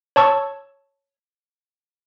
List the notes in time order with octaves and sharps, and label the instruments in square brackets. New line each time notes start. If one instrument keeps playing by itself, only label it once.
[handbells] C#5 A5 C#6 E6